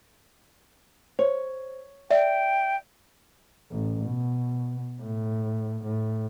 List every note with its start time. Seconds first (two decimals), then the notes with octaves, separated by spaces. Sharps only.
1.19 C5 C#5
2.11 D5 E5 G5
3.72 A1
4.05 B2
5.02 A2
5.85 A2